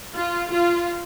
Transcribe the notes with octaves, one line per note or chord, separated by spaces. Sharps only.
F4
F4